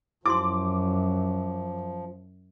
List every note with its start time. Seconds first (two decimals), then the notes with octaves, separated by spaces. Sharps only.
0.26 F#2 F3 E4 F#4 C6 D6